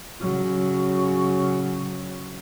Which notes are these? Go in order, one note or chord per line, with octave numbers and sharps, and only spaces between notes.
C#3 F#3